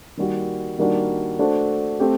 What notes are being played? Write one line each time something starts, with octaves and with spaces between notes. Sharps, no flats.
D#3 G3 A#3 F#4
D#3 G3 A#3 D4 F#4
A3 D4 F#4 A4 C5
A3 C4 G4